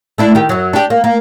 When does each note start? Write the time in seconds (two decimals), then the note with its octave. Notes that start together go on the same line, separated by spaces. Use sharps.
0.18 A3 D4 E4
0.35 D#3 G4
0.49 F#2 F#3
0.73 D4 G4
0.90 A#3
1.04 A#3